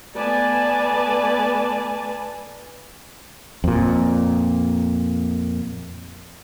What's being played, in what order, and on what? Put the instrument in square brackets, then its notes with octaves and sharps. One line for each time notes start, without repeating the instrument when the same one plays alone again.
[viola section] A3 B3 B4 D5 G#5 A5
[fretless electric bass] F2 A#2